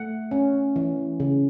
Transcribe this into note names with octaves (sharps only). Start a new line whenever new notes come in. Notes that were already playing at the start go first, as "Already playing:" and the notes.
Already playing: A3 F#5
C#4
E3
C#3